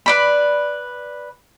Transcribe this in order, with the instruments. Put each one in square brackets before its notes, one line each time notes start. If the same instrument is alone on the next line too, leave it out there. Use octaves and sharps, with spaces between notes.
[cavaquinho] B4 D5 B5